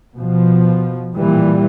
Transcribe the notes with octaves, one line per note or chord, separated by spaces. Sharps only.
B2 F3
A#2 E3 G3